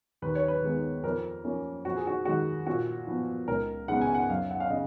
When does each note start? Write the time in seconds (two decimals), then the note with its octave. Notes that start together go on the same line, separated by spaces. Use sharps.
0.22 D#2 B4
0.35 C#5
0.48 B4
0.63 D#3 G#3 B3
1.04 F2 A#4
1.44 F3 A#3 C#4
1.85 F2 F#4
1.96 G#4
2.07 F#4
2.25 D#3 G#3 F#4
2.67 A#2 F#4
3.07 F3 B3
3.48 C#2 A#4
3.88 C#3 G#3 B3 F#5
4.01 G#5
4.15 F#5
4.29 F#2 F5
4.51 F#5
4.60 F5
4.70 C#3 D#5